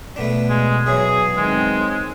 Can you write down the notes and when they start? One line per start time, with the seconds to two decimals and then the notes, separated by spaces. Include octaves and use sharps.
0.16 B2 A3 B3 D4
0.49 G#3
0.86 E2 E3 F#3 G#4
1.37 D#3 G#3 C4